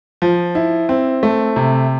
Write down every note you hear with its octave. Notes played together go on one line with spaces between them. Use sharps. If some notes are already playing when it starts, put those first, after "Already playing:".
F3
E4
C4
A3
C3